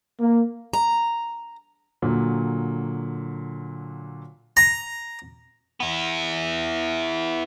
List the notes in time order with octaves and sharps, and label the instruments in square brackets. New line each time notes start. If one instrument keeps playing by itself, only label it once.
[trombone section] A#3
[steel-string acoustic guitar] A#5
[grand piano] A#2 D3 F#3
[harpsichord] A#5
[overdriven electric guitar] B3 E4